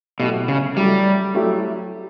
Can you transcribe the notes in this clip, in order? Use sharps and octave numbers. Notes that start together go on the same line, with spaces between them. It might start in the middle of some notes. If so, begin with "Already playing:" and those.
B2 F#3 A3 E4 G4
C#3
F#3 G3 A3 E4 G4
F#3 A3 E4 G4